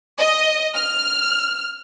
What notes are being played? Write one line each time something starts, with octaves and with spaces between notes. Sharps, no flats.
D#5
F6